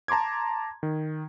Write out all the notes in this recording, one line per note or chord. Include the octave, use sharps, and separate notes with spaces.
A5 A#5 C6 D6 G#6
D#3